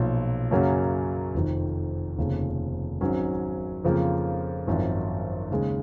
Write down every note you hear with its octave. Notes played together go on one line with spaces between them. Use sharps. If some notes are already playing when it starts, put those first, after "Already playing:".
Already playing: B1 A#2 F3
F#2 C#3 F#3 A#3 C#4
F1 F2 D#3
F1 D#2 C#3
G#1 G#2 F#3 C#4
F2 C#3 F3 A#3
G#1 F#2 F3
D#2 C#3 G#3